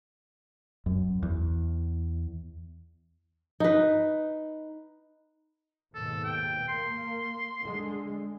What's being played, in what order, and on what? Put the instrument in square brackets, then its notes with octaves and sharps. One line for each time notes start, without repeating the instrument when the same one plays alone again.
[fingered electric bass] F#2
E2
[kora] D#4 B4
[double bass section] D#2 G#2 B2 [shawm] A4
[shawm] G5
[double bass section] A#3 [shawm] C6
[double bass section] D3 G#3